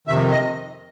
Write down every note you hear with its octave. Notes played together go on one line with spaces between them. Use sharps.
F2 C3 D#3 E5
D#5